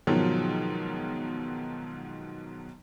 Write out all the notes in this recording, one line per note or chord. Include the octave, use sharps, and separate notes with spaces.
G#2 B2 D#3 F3 F#3